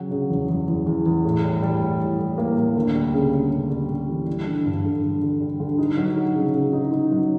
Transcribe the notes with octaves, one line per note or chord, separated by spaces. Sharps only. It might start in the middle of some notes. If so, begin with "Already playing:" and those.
Already playing: C#3 F#3
C#3
E2
E2
E2
E2
E2
A2
G3
G3
A2
G3
A2
A#3
A#3
D2
G3
C#3
G3
C#3
G3
G3
E3
G3
D3
G2
D3
D3
D3
G3
D3
D#4
F#3
D#4
C#3
C#3
D#4
D#4
F#3